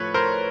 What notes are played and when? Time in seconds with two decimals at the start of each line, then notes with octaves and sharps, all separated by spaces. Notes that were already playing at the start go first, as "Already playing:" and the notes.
Already playing: A2 F3 A3 B4 C#5
0.14 A#4 C5